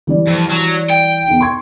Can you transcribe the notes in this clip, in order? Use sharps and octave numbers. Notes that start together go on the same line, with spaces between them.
E3 G3 D5
F2
F#3
G5
E2 D#4
C6 C#6 G#6